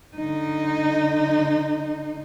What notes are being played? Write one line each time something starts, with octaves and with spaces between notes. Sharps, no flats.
D3 D#4